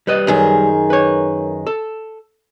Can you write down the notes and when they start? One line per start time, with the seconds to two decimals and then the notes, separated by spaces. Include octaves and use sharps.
0.07 G3 B4 D#5
0.27 F#2 D#3 G#4
0.90 B4 C#5
1.67 A4